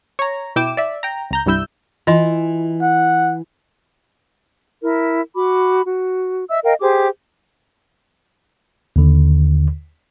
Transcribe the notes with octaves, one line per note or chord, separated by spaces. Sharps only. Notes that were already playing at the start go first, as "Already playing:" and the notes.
C#5 A#5
B2 E4 G5 D6 E7
D5 E5
G5 A#5
C#2 A#5 G6
C2 G2 G3 E4 E6 G6
E3 F4 D#5 C6
F#5
E4 A#4
F#4 B5 D6
F#4
D#5 E5 E6
A#4 D#5 F5 G5
G4 G#4 C5 D6
D#2 D3